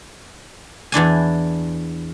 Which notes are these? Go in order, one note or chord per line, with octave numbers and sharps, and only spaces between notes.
E2 E3 D4 G#5